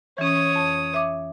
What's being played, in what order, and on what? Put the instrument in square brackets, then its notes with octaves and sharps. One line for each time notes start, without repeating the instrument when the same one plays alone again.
[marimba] E3 C#4 [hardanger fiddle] C#5 D#6
[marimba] F2
E5 D6